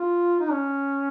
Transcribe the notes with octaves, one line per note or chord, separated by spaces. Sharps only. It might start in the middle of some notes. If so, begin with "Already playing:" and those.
Already playing: F4
D#4
C#4